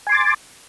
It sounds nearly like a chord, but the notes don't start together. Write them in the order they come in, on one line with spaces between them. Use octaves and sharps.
G#5 C6 D6 A6